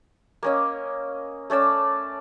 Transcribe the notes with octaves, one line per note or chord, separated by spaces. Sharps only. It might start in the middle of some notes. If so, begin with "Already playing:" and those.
A#3 C#4 D#5
A3 C#4 D5 E6